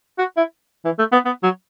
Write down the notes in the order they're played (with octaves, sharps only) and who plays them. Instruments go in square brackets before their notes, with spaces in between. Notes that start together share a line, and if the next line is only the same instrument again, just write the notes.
[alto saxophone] F#4
E4
E3
A3
B3
B3
F#3